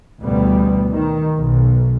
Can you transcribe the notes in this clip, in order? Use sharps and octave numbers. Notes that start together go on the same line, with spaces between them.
A1 D2 B2 G3 B3
D#3
B1